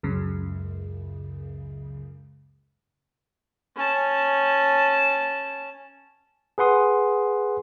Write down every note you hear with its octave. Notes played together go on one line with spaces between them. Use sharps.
C#2 F#2 C#3
C#4 A5
G#4 B4 F#5 C6 D#6